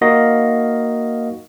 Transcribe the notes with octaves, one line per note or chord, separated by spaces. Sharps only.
A#3 D#4 F#4 A#4 D#5 F5